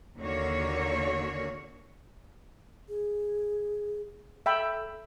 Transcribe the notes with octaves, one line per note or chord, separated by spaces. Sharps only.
D#2 D3 A#3 F#4 C#5
G#4
A4 E5 G5 B5